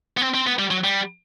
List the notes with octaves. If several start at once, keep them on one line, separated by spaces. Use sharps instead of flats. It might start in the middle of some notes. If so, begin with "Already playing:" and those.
B3
C4
C4
B3
G3
F#3
G3